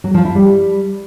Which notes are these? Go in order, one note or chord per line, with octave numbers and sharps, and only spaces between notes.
F#3
F3
E4
G3